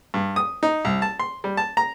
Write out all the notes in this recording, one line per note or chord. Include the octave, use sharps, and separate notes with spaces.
G2
D#6
D#4
C2
A5
C6
G3
A5
A#5